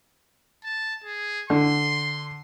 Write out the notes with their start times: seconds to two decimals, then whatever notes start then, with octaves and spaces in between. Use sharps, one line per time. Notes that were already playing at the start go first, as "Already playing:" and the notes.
0.65 A5
1.04 G#4
1.50 D3 C6